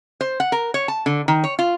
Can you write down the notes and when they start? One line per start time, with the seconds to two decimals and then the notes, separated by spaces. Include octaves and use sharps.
0.21 C5
0.40 F#5
0.52 A#4
0.74 C#5
0.88 A5
1.06 D3
1.28 D#3
1.44 C#5
1.59 F4